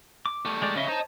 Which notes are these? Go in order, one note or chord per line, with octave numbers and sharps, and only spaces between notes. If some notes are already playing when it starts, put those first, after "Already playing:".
D6
G3 A3
G#3 G4 D5
C#3 C#4 D#5 E5
C5 C#5 D#5 A5 A#5